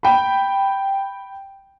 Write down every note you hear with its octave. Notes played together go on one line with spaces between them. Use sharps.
G5 B5